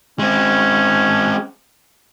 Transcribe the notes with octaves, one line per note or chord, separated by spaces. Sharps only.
G#3 C4 C#4